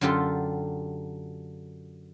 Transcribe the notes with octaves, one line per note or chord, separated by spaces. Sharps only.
F#2 D3 F4 G4 A4